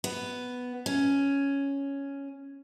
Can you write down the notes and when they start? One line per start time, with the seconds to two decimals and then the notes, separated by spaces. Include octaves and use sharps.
0.04 B3
0.86 C#4